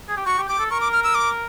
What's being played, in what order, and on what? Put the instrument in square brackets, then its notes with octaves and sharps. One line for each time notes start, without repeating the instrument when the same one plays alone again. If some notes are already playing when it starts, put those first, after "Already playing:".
[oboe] G#4
G4
[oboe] F#4 [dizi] C#6
[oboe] G4
[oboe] G4 [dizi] D6
[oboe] A4
[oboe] A#4 [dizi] C#6
[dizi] D6
F6
E6
D6